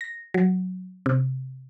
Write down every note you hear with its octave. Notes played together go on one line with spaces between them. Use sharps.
A#6
F#3
C3